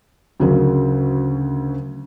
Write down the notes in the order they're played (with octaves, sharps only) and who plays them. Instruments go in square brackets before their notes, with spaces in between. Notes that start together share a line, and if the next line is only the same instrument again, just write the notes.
[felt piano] D2 C#3 F#3 A#4